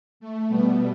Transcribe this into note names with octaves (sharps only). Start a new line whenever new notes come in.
A3
B2 G3 B3